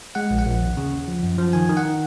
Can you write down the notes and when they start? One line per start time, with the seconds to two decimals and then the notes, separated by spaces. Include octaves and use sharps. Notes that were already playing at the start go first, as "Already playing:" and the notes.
0.15 G#3 F#5
0.31 A#1
0.39 F#5
0.47 A#1
0.61 D#2
0.77 C#3
0.92 D#2
1.08 F3
1.23 F#2
1.38 F3
1.53 D#3 G#5
1.69 D#3
1.77 F#5
1.85 D#3